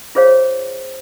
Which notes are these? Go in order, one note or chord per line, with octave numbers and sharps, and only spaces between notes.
F4 G#4 C5 C#5 F5